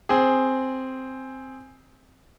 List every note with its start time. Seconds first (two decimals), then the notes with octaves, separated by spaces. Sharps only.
0.09 C4 G#4